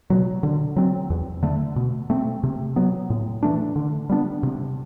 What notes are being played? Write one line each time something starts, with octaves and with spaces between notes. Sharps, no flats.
B2 F#3
D3
F#3 C4
E2
D3 A3
B2
A3 C4
C3
F#3 B3
A2
E3 A3 D4
D3
G3 B3 D4
C3